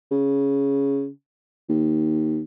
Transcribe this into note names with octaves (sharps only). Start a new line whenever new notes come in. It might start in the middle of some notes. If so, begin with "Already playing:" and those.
C#3
D#2